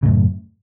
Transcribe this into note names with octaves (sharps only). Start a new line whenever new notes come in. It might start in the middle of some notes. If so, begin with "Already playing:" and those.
F#2 A2 C#3